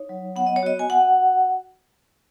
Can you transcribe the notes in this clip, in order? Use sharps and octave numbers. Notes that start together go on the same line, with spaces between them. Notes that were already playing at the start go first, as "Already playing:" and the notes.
Already playing: D#4 C#5
F#3
B3 F#5
D#5
C#5
F#4 D#5
G#5
F#4 F#5